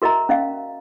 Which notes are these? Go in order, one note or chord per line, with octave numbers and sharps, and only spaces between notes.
F#4 A#4 D#5 E5 A#5
C#4 D#5 F5